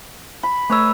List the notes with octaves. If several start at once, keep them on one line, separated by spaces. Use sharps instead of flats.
B5
A3 B4 C#5 A#5 E6